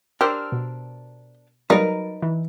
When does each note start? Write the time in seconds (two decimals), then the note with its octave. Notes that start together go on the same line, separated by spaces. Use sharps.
0.21 D4 G4 A#4 C5 E6 F6
0.52 B2
1.70 F#3 G3 A#3 D#4 A#4 B4
2.22 E3